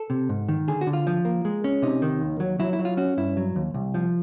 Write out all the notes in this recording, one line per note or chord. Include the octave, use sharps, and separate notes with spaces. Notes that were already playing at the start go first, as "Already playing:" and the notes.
Already playing: A4
C3
G#2
D#3
D3 G#4
F#4
D3
F4
F3
A#3
G#3
C#4
C3 D#4
D#3
D#2
F#3
F#3 E4
E4
F#3
F4
C#4 F#4
G2 E4
F#3
D#2
C2
F3